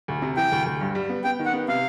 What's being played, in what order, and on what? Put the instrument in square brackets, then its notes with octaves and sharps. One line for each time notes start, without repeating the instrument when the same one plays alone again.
[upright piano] D2
C3
[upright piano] E3 [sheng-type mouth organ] G5
[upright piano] D2
D2
G2
G3
B3
[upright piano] B3 [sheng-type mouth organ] G5
[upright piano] D#3
[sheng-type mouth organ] F#5
[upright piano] B3
[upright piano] C3 [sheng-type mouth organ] F5